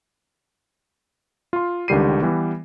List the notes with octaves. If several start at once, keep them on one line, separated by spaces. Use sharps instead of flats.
F4 C6
C#2 D3 D#3 G3 C7 D#7
E3 G3 B3